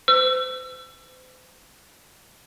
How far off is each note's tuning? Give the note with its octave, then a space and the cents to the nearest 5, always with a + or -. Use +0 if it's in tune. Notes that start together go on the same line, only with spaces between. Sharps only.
C5 -40 E6 +30